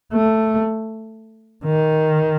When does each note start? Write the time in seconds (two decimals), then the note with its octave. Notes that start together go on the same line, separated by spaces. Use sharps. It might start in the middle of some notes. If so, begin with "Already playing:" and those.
0.13 A3
1.65 D#3